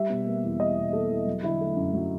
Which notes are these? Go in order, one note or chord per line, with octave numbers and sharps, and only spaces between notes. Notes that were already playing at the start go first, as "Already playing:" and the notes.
Already playing: G3 E5
B2
A#3
E2
G3 D#5
B2
A#3 A4
E2
F#3
D3 E4
A3
F#2
F#3